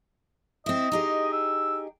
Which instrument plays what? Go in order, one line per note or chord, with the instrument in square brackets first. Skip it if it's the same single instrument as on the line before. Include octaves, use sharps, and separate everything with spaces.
[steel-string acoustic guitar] C4 E4 [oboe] D#5
[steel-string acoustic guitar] D#4 G4 G#4
[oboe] E6